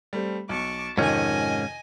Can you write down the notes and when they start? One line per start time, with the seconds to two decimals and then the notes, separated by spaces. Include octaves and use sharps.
0.13 G3 A3 C4
0.49 B1 A5 C#6 D6
0.98 F2 G#2 C3 D#3 C#4 D#5 G#5